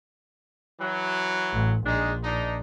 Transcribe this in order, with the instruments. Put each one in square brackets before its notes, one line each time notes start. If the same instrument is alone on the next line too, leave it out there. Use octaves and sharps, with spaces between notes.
[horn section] E3 F#3
[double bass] A1
[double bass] A#1 [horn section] G#3 D4 D#4
[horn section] D4 D#4